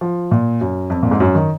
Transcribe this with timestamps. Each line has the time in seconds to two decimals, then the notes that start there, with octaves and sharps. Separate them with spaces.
0.01 F3
0.31 A#2
0.61 F#2
0.90 F2
1.03 A#2
1.11 G#2
1.20 F#2
1.35 D#3